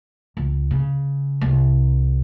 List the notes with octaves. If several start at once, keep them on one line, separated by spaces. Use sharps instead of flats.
C#2
C#3
C2